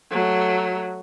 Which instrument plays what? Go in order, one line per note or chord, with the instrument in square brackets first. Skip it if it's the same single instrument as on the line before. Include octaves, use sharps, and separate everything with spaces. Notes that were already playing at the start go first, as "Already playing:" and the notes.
[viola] F#3 A3